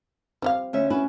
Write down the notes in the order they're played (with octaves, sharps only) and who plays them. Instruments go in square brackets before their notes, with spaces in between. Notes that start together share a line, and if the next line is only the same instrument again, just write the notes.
[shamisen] F3 G3 F5 [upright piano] C4
[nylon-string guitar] D2 C#4 E5
[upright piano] C#4 [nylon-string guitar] E4 F#4 B4